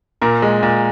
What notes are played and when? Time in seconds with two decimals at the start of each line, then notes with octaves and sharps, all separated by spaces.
0.21 A#2 A#4
0.42 G#3
0.63 A#2